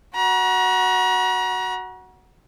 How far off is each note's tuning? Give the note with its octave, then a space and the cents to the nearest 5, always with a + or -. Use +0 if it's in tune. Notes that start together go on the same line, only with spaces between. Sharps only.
F#4 +0 A#5 +40